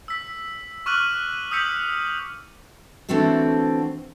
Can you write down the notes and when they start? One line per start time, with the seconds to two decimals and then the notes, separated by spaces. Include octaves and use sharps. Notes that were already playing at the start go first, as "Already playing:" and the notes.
0.08 E6 B6
0.86 C#6 D6 F6 F#6 D#7 F#7
1.51 D#6 E6 G6 B6 C#7 F#7
3.09 D3 E3 A3 C4 F#4 A4